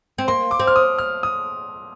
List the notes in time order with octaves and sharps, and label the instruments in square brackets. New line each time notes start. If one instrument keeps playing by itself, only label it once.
[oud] C4
[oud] A#3 [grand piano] C6
[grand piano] D6
[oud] C4
[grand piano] F6
D#6
F6
D#6